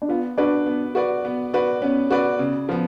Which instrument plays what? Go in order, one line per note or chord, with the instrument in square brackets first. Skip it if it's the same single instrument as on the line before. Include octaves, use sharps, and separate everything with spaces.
[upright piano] D4
[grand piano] B3 [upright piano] F4
[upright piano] D4 [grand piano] F#4 B4 D5
[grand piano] B3
F#4 B4 D5
B3
F#4 B4 D5
[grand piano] B3 [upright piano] C#4
[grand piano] F#4 B4 D5
C#3
F3 B3